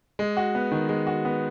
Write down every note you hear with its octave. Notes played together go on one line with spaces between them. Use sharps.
G#3
F#4
B3
D#3
G#3
F#4
B3